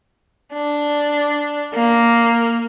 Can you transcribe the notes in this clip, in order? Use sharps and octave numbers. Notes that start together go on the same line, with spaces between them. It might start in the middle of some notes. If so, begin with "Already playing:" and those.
D4
A#3